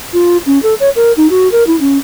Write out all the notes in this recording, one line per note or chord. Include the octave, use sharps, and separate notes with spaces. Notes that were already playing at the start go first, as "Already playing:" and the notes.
F4
C#4
A4
C#5
A#4
D#4
F#4
A#4
E4
C#4